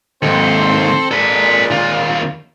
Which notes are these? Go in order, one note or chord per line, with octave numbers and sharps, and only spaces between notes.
D#2 G#2 C4 A4 C5
A#2 G#3 A4 B4
D#2 F4